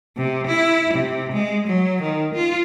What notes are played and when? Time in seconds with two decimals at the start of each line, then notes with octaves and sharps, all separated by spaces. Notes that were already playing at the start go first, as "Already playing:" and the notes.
0.17 C3
0.47 E4
0.94 C3
1.32 G#3
1.68 F#3
2.02 D#3
2.35 F4